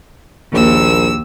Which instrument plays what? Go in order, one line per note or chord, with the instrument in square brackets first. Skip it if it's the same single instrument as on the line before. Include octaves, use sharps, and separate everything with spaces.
[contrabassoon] A#1 [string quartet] D#2 E6